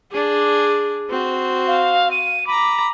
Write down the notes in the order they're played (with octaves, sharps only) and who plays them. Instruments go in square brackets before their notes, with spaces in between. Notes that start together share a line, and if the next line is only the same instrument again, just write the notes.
[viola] D4 G#4
C4 F#4
[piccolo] F5
D#7
[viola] A#5 D6 [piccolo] B5